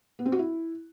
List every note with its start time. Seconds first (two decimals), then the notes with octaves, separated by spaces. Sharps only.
0.19 B3
0.26 C4
0.32 F#4
0.39 E4